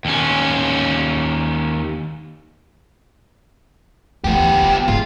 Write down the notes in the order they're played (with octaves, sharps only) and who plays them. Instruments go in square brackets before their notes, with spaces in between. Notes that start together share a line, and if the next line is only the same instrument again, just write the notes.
[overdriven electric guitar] D#2 C#4
[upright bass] D2 E3 [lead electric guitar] B3 G4
[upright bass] F4
[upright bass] G#2 [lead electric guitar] F4